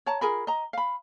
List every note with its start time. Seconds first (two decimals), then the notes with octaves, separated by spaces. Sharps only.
0.06 C#5 A5 A#5
0.21 F4 G#4 A#4 B5
0.47 D#5 A#5
0.73 F5 B5